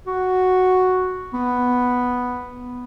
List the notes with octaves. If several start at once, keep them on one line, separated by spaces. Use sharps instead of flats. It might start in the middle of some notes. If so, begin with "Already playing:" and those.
F#4
B3